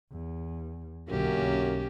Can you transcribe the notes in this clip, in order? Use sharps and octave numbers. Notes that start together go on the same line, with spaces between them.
E2
B1 F#2 D3 A#3 C#4 G4
B1